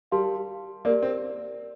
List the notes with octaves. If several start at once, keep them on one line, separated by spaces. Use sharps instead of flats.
G3 A#4 F5 A5 C6
A#3 G4 A#4 D5
C4